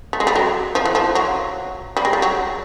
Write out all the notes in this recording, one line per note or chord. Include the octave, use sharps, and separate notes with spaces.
A3
G#3
G3
F#3
F3
E3
F3
F#3
G3
G#3
G3
F#3